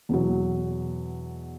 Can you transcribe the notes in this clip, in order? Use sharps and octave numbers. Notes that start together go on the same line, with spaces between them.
E2 B2 F#3